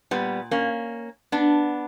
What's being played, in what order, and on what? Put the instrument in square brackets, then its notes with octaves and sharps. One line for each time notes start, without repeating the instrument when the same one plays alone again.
[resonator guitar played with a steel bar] A#2 G3 B3
A#3 C#4
B3 D4